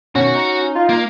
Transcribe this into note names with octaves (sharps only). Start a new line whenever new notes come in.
B2 D#3 C#4 F#4 F#5
D#4
F4
A#3